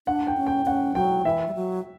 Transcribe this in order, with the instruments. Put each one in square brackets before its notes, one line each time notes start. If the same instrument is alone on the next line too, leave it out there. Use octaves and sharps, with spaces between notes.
[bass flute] D4 [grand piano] F#5
[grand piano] G5
[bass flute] C#4
[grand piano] G5
[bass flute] C#4 [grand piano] F#5
[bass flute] F#3 [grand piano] G5
[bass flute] E3 [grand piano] E5
[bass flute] G3
F#3